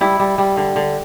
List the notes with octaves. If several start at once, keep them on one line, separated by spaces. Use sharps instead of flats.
G3 E4
G3
G3
D3
D3